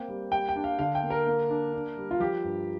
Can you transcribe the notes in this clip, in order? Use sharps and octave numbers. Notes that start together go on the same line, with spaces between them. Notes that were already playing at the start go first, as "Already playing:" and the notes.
Already playing: A#3 C4 G5
G3
G3 G5
G5
D4
F5
D3 F5
G5
A#3
A#4
A#3
D4
D4
G3
F4
F3 G4
G2